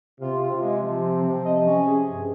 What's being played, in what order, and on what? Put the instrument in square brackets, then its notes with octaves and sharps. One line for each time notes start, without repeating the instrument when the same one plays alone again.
[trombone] C3 [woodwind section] F4
[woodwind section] F4
[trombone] C3
[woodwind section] G#3
F3
C4
F3
[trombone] C3 [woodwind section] D#5
[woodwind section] C#4
G#4
G2